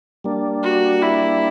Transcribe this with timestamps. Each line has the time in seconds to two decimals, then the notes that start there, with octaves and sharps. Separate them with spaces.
0.24 G3 A#3 D4
0.63 F#4
1.02 E4